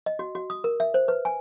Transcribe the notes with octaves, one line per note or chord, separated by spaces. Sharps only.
D#5
F#4
F#4
D#6
A#4
E5
C5
B4
G#5